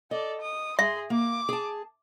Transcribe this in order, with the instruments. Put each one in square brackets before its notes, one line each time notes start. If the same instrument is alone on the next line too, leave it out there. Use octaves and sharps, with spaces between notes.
[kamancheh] A4 D5 [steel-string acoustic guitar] D#5
[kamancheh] D#6
[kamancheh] G#4 C6 [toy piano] E5
[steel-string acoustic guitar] A#3 [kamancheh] D6
[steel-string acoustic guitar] G#4 A5